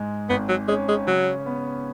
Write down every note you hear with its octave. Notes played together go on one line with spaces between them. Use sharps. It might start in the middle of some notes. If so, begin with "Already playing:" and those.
Already playing: G#2 G#3
G#1 B3
F#3
G#3 C#4
G#3
C#3 F#3
B3